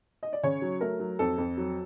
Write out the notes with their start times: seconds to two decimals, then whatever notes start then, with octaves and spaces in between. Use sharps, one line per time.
0.23 D#5
0.33 D5
0.43 C#3 C#5
0.62 F#3
0.81 A3 A#4
1.00 F#3
1.19 F2 A4
1.38 F2
1.57 F#3